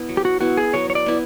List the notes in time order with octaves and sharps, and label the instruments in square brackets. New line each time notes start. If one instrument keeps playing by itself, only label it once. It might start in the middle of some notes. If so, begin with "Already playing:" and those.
Already playing: [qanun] B3 E4
F#3
[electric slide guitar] G4
F#4
[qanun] B3 E4 [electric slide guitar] F#4
[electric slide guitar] G#4
[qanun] F#3 [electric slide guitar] C#5
[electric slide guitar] C#5
D5
[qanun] B3 E4